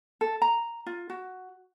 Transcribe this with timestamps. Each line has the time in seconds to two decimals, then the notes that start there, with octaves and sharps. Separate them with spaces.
0.21 A4
0.42 A#5
0.86 F4
1.10 F#4